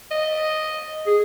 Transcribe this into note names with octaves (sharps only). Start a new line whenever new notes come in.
D#5
G#4